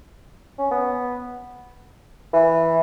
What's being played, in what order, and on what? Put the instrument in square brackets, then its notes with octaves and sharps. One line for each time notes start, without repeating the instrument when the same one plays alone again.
[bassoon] C#4
B3
E3